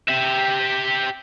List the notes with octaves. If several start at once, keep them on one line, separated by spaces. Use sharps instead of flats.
G4 E5